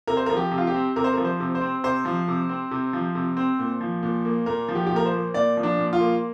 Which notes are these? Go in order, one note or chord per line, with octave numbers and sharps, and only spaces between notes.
C3 A#4
C5
A#4
F3
G4
C3
F4
G4
C4
C3 A#4
C5
A#4
F3
C5
C3
C5
C4
C3 C5
F3
C3
C4
C3
F3
C3
C4
A#2
F3
A#2
A#3
A#2 A#4
F3
G4
G4
A#2
A#4
C5
A#3
A#2 D5
F3
D4
A#2
F4
A#3